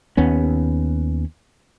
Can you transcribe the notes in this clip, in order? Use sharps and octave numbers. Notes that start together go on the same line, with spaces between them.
D#2 B3 C#4